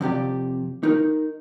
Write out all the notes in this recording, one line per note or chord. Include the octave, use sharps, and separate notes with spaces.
F2 C3 G4 D5
D#4 A#4